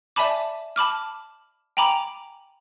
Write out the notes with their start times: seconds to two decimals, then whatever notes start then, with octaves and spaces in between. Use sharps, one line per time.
0.16 D5 E5 G#5 A5 B5 D6
0.76 A5 B5 D6 F6
1.77 G5 G#5 A#5 B5 D6